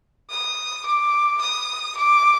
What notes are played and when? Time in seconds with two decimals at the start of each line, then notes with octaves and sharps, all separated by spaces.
0.30 D#6
0.86 D6
1.42 D#6
1.97 D6